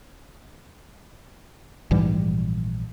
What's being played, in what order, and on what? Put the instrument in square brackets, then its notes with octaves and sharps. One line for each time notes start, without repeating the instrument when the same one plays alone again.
[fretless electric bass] A#1 G#2 E3 G3